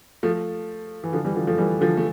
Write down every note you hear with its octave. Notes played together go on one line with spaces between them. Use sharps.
F3 A3
E3
D3 F3
E3 G3
D3 F3
F3 A3
E3 G3
D3 F3
A3